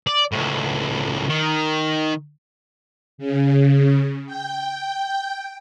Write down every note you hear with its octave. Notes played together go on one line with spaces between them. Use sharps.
D5
C#2 A2
D#3
C#3
G5